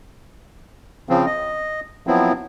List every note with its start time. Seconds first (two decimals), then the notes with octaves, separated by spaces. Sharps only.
1.09 C#3 F3 C4
1.26 D#5
2.07 F3 F#3 B3 C4 E4